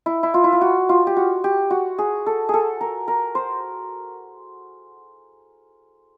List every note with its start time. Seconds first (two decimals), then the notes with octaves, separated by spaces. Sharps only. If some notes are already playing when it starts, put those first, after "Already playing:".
0.06 E4
0.23 E4
0.34 F4
0.44 E4
0.52 F4
0.61 F#4
0.89 F4
1.07 G4
1.17 F#4
1.44 G4
1.70 F#4
1.98 G#4
2.26 A4
2.49 G#4 A4
2.81 A#4
3.08 A#4
3.35 C5